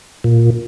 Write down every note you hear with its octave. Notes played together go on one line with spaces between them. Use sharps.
A#2